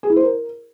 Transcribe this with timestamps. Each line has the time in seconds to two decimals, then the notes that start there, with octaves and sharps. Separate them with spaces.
0.03 G#4
0.10 E4
0.16 C5
0.23 A#4